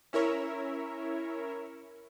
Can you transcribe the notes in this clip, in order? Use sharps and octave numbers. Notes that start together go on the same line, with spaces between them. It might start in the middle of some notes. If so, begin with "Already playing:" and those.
C#4 E4 A#4 C#5 E5